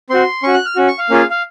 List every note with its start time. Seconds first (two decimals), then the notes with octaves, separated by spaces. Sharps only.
0.10 C4 F#4 C6
0.43 C#4 F#4 C#6
0.54 F#6
0.66 F6
0.76 C#4 F#4
0.88 C#6
0.99 F5
1.10 A#3 C#4 F4 G#4
1.31 F5